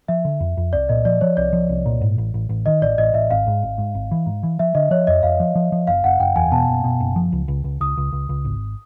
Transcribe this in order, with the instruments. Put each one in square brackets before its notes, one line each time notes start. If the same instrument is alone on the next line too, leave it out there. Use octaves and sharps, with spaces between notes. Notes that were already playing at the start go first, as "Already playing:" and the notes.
[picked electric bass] F3 [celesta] E5
[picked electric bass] D3
F2
F2
[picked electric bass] C2 [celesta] D5
[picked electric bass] A#2 [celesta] D#5
[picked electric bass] F3 [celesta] D5
[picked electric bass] F3 [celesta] C#5
[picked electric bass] C2 [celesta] D5
[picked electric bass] F3
C2
A#2
G#2
A1
A1
A1
[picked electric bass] D#3 [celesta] D#5
[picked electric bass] A1 [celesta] D5
[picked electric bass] A1 [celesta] D#5
[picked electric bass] A1 [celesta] E5
[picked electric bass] G#1 [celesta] F5
[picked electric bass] G#2
G#1
G#2
G#1
E3
G#2
E3
[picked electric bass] F3 [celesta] E5
[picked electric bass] D3 [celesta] D#5
[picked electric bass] F3 [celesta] C#5
[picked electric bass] F2 [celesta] D#5
[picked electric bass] F2 [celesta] F5
[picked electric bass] F3
F3
F3
[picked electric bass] F#1 [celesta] F5
[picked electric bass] F#1 [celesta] F#5
[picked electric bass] F#1 [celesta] G5
[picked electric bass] E2 [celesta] G#5
[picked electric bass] B2 [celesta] A5
[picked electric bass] F#1
B2
F#1
F3
C#2
C#2
C#2
[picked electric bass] C#2 [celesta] D#6
[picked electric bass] C#2
C#2
C#2
G#1